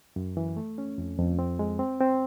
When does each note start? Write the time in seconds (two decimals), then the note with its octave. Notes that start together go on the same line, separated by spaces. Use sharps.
0.16 F#2
0.37 E3
0.57 A3
0.78 C#4
0.98 F2
1.19 F2
1.39 C4
1.59 G#3
1.79 C4
2.00 C4